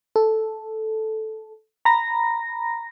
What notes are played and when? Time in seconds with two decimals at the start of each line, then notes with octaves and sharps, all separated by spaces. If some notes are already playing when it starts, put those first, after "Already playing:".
0.16 A4
1.85 A#5 B5 A#6